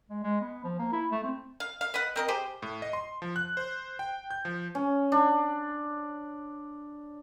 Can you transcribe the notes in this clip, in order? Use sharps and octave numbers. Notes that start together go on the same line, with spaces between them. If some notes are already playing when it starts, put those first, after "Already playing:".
G#3
G#3
B3
F3
A#3
E4
A3
C4
F5
F5
B4 D#5 F#5
C4 A#4 D#5
G4 G#4 C5
A2
D#5
C6
F3
F#6
C5
G5
G6
F3
C#4
D4